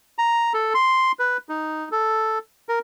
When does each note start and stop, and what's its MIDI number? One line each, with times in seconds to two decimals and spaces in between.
0.18 0.53 82
0.54 0.73 69
0.74 1.12 84
1.19 1.37 71
1.49 1.89 63
1.92 2.38 69
2.69 2.79 70